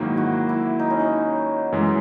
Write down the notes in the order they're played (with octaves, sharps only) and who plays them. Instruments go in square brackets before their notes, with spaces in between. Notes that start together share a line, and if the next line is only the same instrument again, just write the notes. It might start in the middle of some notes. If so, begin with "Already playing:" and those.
Already playing: [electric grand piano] G#2 D#3 F#3 A#3 [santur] E4
[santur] F#4
E4
D#4
C#4
D#4
[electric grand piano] F#2 E3 G#3